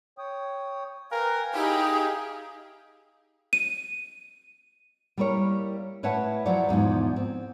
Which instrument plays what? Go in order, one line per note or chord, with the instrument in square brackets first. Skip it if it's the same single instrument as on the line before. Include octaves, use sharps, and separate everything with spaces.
[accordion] C#5 G5 D#6
[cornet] A#4 [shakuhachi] B4 [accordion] F5 G5 G#5
[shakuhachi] D#4 [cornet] E4 [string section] G4 G#4
[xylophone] D#7
[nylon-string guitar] G3 A#3 E4 A#4 C#5
A2 B4 C#5 E5 F#5 A5
F3 F#3 E4 C5 D5 F#5
E2 G#2 B2 F3
C4